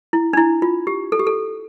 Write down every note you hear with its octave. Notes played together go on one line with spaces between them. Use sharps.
E4
D4
E4
F4
G4
A4
G4
A4